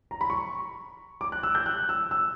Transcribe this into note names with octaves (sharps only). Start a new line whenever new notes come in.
A#5
B5
C#6
D6
F#6
E6
G6
F#6
E6
E6